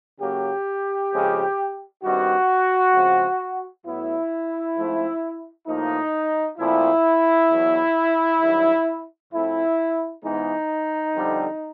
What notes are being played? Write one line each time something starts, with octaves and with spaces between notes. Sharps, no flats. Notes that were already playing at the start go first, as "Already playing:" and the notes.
C#3 F#3 A#3 G4
F2 C#3 F3 G#3 C4
G2 D#3 G3 C4 F#4
C#3 F3 G#3 C4
A2 F#3 B3 E4
G#2 F3 A3 C4
A2 F3 A#3 D#4
A#2 F3 A3 C4 E4
E2 B2 F#3
G2 D#3 F#3
A2 F3 A3 C4 E4
G#2 E3 G#3 B3 D#4
F2 D3 G3 C4